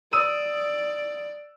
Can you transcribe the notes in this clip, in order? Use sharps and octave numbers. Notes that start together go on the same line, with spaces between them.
D5 D#6 E6 D#7